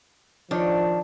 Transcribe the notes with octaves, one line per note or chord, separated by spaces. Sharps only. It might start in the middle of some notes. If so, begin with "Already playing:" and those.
D#3 F3 D4 C#5